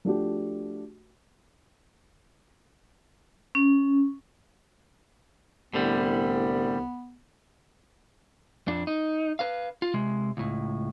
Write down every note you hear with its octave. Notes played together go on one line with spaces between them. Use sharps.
F3 A3 D4 F#4 G4
C#4
C2 A2 D3 G3 B3
F2 D4
D#4
B4 F5
F4
C3 G#3
C#2 A2